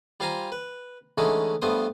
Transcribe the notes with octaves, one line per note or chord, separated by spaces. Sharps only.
G3 F4 C5 F5 G#5 A#5
B4
D3 E3 G#3 A3 C#4 D#4
G2 A3 B3 C5 D#6